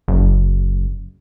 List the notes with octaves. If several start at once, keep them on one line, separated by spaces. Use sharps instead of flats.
F#1